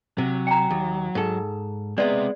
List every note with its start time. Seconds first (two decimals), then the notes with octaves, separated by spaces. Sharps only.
0.18 C3 F#3
0.47 G5 G#5 A#5
0.70 D#2
1.15 G#2 A4
1.98 G#3 B3 C4 D5 E5